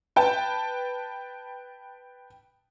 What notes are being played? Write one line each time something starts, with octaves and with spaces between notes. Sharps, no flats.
B4 G5 A5